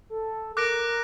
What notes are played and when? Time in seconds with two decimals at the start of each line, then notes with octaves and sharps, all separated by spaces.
0.10 A4
0.57 A#4 D6 F#6 A#6 D7